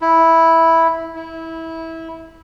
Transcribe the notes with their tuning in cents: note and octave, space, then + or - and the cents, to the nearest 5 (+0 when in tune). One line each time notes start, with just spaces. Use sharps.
E4 -5
E4 -20